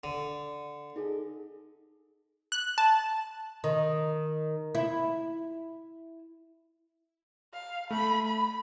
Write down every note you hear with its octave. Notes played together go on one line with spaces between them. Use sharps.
D3
D#4 G#4 A4
F#6
A5
D#3
E4
F5
A3 B5
B5